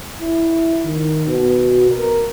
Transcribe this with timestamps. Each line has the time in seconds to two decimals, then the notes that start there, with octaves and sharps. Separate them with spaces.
0.21 E4
0.84 D#3
1.28 B2
1.90 A#4